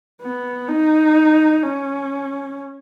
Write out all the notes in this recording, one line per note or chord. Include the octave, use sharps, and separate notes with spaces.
B3
D#4
C#4